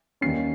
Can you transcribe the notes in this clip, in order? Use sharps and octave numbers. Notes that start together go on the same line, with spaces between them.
D#2 D#3 G3 A#3 C#4 C7